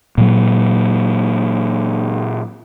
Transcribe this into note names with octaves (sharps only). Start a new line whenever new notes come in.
A#2 F#3